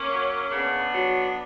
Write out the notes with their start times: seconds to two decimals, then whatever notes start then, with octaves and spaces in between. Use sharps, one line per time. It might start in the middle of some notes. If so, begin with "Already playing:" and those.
Already playing: A#3 C#4
0.10 F#3
0.51 C#3 B3 D4
0.94 F#3